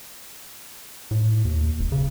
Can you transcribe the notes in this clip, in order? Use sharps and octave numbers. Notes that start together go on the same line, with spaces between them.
A2
D#2
E1
C#3